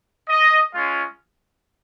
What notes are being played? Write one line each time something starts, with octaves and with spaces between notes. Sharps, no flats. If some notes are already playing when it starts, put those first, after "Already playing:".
D#5
G#3 C#4 F4